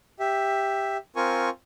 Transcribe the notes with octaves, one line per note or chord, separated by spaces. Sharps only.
G4 E5
C4 F4 A#4 G#5 C#6